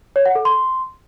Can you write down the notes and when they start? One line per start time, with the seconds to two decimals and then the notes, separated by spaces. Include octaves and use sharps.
0.16 C#5
0.26 F#5
0.35 A4
0.45 C6